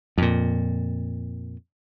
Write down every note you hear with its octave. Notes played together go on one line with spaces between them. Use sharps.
F2 A#2